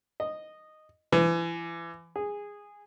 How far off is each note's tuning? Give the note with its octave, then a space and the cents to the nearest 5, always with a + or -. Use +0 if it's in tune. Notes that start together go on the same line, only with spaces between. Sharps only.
D#5 -5
E3 +35
G#4 -15